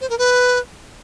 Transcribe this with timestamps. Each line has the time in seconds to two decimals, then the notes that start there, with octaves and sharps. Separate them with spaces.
0.01 C5
0.10 A#4
0.18 B4